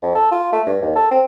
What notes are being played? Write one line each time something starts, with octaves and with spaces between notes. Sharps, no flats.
F2
A4
F4
A3
G2
D#2
A4
C4